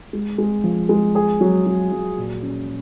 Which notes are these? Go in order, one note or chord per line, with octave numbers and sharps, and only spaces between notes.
G#3
G#3
F3
G#3
G#4
F#3
F#3
F#3
A#2
C#4